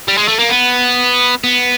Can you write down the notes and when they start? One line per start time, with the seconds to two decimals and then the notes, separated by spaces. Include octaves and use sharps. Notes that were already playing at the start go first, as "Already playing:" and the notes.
0.08 G3
0.18 G#3
0.28 A3
0.39 A#3
0.49 B3
1.44 B3